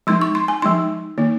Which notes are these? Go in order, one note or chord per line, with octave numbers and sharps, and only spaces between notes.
F3 G#3 D#4 C6
C#6
C6
G#5
F3 G#3 D#4 C6
D#3 A#3 D#4